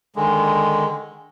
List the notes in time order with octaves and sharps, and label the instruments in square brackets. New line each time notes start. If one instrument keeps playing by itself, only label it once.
[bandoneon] D3 D#3 G#3